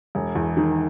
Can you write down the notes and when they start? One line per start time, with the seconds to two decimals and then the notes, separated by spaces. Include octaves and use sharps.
0.15 E1
0.35 E2
0.57 D#3